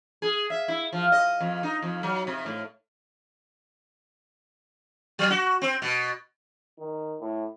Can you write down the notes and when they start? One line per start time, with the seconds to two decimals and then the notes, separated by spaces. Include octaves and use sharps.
0.22 G#4
0.50 E5
0.68 E4
0.93 F3
1.12 D#5
1.41 F2
1.63 D#4
1.82 F2
2.03 F#3
2.27 C3
2.46 A2
5.19 F#3
5.30 F#4
5.62 C4
5.82 B2
6.80 D#3
7.20 A2